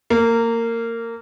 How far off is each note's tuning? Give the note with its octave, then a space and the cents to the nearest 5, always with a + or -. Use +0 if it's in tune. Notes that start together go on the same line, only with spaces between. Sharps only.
A#3 -20